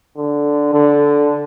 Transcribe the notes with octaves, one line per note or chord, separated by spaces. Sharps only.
D3
D3